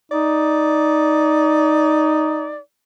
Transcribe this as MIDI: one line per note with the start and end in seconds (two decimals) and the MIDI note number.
0.11 2.57 63
0.11 2.58 74